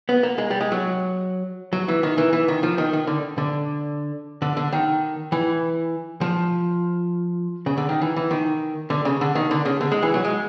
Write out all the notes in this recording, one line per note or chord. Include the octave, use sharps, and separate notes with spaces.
B3
A#3
G#3
G3
G#3
F#3
F#3
E3
D#3
E3
E3
D#3
F3
D#3
D#3
D3
D3
D3
D3
D#3
E3
F3
C#3
D3
D#3
E3
E3
D#3
D3
C#3
D3
D#3
D3
C#3
D3
G#3
E3
F#3
G#3